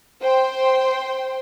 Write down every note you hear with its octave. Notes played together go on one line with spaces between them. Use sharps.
C5 G5 C6